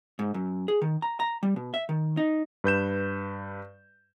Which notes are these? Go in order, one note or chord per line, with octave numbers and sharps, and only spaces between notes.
G#2
F#2
G#4
D#3
A#5
A#5
G3
B2
E5
D#3
D#4
G2 B4 G6 E7